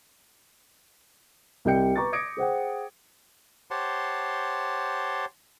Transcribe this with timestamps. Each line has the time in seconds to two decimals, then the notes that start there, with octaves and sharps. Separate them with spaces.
1.65 C2 G3 D#5 G5 G6 C#7
1.96 B4 A#5 C#6 D6 A6
2.12 D6 D#6 G#6 A#6 C#7 D7
2.37 G#4 C5 F#5 G5
3.71 G4 C5 C#5 F#5 A5 C6